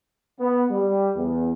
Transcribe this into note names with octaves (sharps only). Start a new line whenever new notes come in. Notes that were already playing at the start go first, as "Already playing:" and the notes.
B3
G3
E2